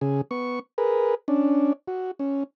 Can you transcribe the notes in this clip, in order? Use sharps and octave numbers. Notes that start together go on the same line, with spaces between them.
C#3 G#4
B3 C#6
G#4 A#4 B4
C#4 D4
F#4
C#4